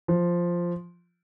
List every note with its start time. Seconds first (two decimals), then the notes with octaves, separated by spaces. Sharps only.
0.08 F3